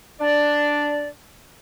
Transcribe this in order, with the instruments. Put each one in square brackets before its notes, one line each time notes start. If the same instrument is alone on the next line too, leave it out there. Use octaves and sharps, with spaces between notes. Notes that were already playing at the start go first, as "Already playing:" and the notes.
[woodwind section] D4 D5